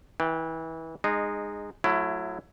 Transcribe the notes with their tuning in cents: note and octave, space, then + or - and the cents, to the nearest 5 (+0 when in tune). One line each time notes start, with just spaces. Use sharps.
E3 -25 G5 +0
G#3 -10 D#4 -20
F#3 -20 A3 +0 E4 +20